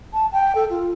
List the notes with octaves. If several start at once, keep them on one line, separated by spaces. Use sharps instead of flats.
A5
G5
A4
F4